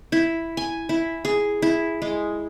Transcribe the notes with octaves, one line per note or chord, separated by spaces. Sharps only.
E4
G#5
E4
G#4
E4
G#3